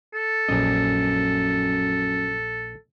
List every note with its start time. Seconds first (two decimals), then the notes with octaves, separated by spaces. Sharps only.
0.14 A4
0.48 A#1 F#2 D#5